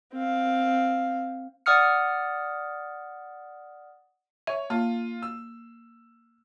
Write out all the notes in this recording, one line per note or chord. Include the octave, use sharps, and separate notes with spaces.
C4 F5
D5 F#5 D#6 F6 C#7
C#5 E5
A#3 F4
E6